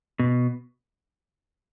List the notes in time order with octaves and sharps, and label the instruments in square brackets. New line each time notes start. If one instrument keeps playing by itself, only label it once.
[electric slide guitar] B2